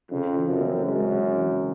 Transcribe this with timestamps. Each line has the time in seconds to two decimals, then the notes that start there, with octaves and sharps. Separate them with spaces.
0.11 F2 C#3
0.36 E3
0.49 F#2
0.61 C4
0.86 F#2 G#3
1.11 C#3
1.35 E3